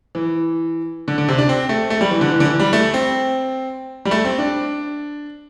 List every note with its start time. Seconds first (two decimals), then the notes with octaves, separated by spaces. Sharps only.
0.15 E3
1.08 D3
1.18 D3
1.28 C3
1.38 D4
1.49 C4
1.69 A3
1.90 A3
2.01 G3
2.11 E3
2.21 D3
2.32 E3
2.40 D3
2.45 E3
2.59 G3
2.73 A3
2.94 C4
4.05 G3
4.11 A3
4.25 C4
4.38 D4